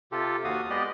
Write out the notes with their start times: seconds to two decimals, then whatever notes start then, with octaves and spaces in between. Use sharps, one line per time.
0.12 C3 F4 G4 A4
0.44 D#2 F#4 F5 D#6
0.70 G#3 B3 G4 D5 D#5